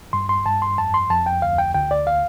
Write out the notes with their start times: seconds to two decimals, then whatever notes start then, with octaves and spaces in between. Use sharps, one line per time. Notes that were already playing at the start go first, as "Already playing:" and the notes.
0.13 G2 C6
0.29 C6
0.46 G2 A5
0.62 C6
0.78 F2 A5
0.94 C6
1.10 F2 A5
1.26 G5
1.42 D2 F5
1.58 G5
1.74 D2 G5
1.91 D5
2.07 F5